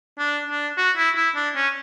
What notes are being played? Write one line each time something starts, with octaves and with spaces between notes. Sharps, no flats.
D4
D4
F#4
E4
E4
D4
C#4